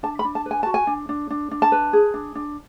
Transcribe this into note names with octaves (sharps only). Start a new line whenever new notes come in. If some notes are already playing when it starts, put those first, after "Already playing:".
D4 A5
B5
D4
A5
B4
G#5
F#4 A5
G#5
D4
D4
D4
D4
A5
B4
G#4
D4
D4